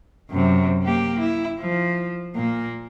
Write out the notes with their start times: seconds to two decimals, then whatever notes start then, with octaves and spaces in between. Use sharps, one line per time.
0.30 F#2 C3
0.83 A#3 G4
1.20 E4
1.60 F3
2.35 A#2 A#3